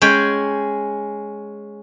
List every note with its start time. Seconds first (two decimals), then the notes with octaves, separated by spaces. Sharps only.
0.02 G#3 C#4 G5 B5